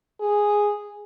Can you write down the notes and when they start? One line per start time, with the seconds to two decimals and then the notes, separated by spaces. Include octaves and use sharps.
0.21 G#4